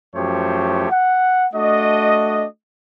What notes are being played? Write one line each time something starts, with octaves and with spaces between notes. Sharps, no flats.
F#2 F3 A3 G4 C5 C#5
F#5
A3 D4 F#4 D#5